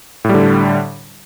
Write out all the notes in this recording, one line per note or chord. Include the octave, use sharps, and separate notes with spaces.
A2 D3 G3